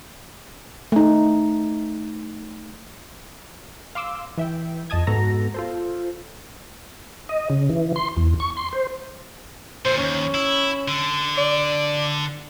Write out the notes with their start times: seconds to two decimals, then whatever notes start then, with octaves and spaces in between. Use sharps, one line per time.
0.92 A3 D#4
3.95 F5 C6 D6 E6
4.37 E3 E5 G5
4.90 F2 D#5 A5 D#6 G#6
5.07 G#2 B3 F#4 A4 A#5 A#6
5.54 F4 A4 C5
7.29 D#5
7.50 C#3
7.70 E3
7.96 C6
8.17 E2
8.40 C#6
8.57 C6
8.73 C5
9.85 A#2 D3 C5
9.98 D#2 C#4
10.34 E4
10.88 D3
11.38 D5